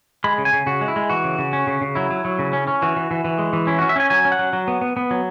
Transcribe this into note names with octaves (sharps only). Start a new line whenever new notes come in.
G#3 B5
C#3
G#5
C#3
C#3 F#4
G#3
E4
G#3
E3 F#4
C#3
C#3
C#4
C#3
C#3
F#3 E4
F#3
F#3
C#3
C#4
C#4
E3 F#4
E3
E3
E3
G#3
E3
C#4 E4
C#4 F#4
E5
C#4 G#5
F#3 G#5
C#4
F#5
F#3
F#3
B3
B3
B3
F#3